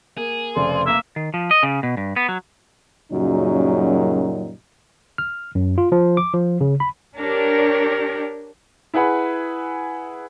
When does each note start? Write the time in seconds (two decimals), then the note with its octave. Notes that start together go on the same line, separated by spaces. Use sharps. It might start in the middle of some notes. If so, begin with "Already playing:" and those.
0.17 A#3 G#4
0.56 F1 C#3 A4 C5 D5 C6
0.86 A#3 E5
1.16 D#3
1.34 F3
1.51 D#5
1.63 C#3
1.83 B2
1.97 G2
2.16 B3
2.29 F#3
3.12 F#2 A#2 C#3 F#3 G3 D#4
5.18 F6
5.55 F#2
5.78 F4
5.92 F3
6.17 D6
6.33 F3
6.61 C#3
6.80 B5
7.18 D4 G4 A#4 C#5 D5
8.94 E4 G#4 B4 F#5 B5